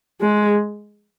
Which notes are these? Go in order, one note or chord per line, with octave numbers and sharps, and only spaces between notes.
G#3